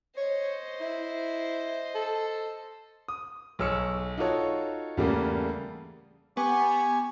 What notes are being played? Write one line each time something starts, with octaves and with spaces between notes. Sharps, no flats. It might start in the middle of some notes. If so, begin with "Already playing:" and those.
C5 C#5 D#5
E4
A4
D#6
B1 G#4 C#5 E6 F6 C#7
D#4 F4 F#4 A4 C#5
E2 C#3 G3 A3 A#3
B3 G4 G#5 C#6